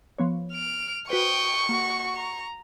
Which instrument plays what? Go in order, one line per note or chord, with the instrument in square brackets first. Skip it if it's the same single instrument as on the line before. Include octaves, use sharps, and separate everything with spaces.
[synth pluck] F3 B3 C#5
[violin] F6 D7
[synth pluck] F#4 B4 C5 [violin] G5 D#6 [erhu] C#6
[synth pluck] A#3 [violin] F#4
[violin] A#5